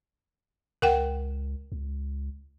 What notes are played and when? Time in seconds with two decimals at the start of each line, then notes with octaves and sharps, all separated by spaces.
0.82 C#2 A#4 F#5 G5
1.72 C#2